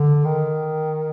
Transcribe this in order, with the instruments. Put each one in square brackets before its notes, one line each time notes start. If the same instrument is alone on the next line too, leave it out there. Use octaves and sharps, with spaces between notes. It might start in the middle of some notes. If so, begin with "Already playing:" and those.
Already playing: [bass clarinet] D3
D#3